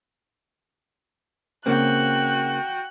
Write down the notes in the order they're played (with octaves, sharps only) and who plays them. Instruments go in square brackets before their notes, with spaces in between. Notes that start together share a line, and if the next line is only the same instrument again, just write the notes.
[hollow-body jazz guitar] C#3 A#3 C4 [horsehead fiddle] F#4 G5 [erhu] F#6